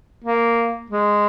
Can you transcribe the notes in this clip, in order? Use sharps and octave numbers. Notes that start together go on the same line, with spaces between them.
A#3
G#3